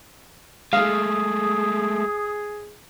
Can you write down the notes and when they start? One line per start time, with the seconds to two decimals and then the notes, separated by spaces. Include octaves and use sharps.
0.73 G#3 A3 G#4 F5 D#6